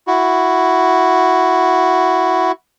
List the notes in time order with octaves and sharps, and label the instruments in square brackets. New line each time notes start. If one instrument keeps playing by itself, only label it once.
[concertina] E4 F#4